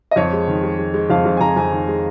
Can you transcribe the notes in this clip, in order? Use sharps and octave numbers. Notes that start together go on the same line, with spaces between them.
D#5
F2 C#5
G#3
D#3
G#3
G#3
G#3
F2 F5
F2
G#5
F2 A#5
F2 G#5
D#3
G#3